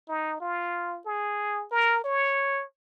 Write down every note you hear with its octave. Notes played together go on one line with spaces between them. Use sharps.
D#4
F4
G#4
A#4
C#5